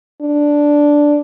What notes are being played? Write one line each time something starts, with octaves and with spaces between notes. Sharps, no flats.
D4